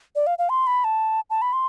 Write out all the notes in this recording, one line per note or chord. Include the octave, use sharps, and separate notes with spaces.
D5
F5
F5
C6
B5
A5
A5
B5
C6